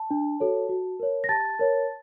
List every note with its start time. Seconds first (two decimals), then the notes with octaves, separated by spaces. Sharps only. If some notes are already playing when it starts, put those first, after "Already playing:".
Already playing: A5
0.11 D4
0.40 F#4 A4 C#5
0.69 F#4
1.00 A#4 C#5
1.24 A#6
1.29 G4 A5 A6
1.59 A#4 C#5